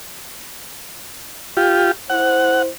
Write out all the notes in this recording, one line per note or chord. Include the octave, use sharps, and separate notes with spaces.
F4 G4
E4 C5 F#5